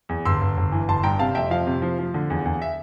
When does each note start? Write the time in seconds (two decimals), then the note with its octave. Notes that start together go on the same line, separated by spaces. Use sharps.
0.09 E2
0.25 G1 C6 E6
0.41 G1
0.57 G1
0.72 E3
0.88 G1 A5 C6
1.03 G2 G5 A#5
1.19 C3 F5 A5
1.35 F2 E5 G5
1.50 F3 F5
1.67 C3
1.82 F3
1.99 F3
2.14 D3
2.30 E2
2.45 E2
2.62 E5